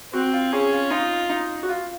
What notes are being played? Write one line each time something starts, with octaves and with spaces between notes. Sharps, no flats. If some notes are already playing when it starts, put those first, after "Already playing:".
C4 F#4
F4
C#4 G#4
F4
D#4 F4
D#4
F#4
F4